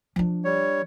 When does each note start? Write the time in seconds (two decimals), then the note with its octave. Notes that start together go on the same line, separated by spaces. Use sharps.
0.16 F3 D4
0.45 G3 C#5